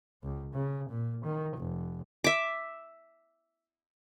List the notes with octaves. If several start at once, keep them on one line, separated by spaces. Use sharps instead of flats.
C#2
C#3
A#2
D#3
F1
E5 D6